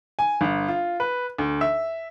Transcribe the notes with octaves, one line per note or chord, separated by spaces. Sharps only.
G#5
G1
F4
B4
D2
E5